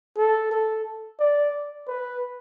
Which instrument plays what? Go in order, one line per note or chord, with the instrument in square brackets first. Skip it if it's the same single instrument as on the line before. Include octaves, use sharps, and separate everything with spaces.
[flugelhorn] A4
A4
D5
B4